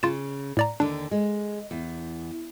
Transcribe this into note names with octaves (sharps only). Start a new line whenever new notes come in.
C#3 F4 A6 E7
A2 D5 A#5
D#2 D3 D4
G#3
E2